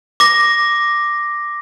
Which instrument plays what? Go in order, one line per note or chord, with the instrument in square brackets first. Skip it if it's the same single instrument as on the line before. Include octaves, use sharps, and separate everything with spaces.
[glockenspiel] D6 A#6